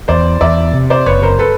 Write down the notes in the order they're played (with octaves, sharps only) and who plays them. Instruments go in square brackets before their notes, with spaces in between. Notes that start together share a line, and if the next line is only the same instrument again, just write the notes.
[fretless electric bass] E2 [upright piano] C5 D5
[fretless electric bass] E2 [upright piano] D5 E5
[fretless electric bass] C3
[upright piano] C5 D5
[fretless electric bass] F#1 [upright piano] B4 C#5
[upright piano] A#4 C5
A4 B4